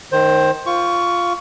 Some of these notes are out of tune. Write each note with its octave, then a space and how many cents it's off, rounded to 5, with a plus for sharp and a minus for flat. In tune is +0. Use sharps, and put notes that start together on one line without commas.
D#3 +0 C5 +15
F4 +0 C#6 +15